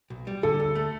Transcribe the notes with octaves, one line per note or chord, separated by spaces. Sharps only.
B1
G3
D3 A4
D2
A3